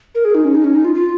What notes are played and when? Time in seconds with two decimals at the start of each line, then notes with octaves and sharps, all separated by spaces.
0.15 A#4
0.25 G#4
0.35 D#4
0.45 C#4
0.55 D#4
0.64 C#4
0.75 D#4
0.85 F4
0.95 F4